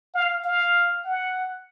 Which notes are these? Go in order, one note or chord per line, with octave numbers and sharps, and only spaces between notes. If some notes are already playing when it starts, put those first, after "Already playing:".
F5
F5
F#5